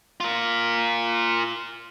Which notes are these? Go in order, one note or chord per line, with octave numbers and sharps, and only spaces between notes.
F4 A#4